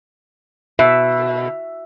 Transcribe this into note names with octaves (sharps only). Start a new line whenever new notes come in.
B2 E5